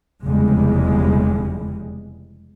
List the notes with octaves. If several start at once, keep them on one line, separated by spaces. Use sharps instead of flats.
F1 E2 C#3 G3 G#3